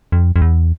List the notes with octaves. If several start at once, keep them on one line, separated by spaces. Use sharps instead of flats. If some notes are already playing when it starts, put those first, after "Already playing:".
F2
F2
E2